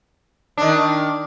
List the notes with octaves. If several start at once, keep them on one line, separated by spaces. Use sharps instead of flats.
D#3 D4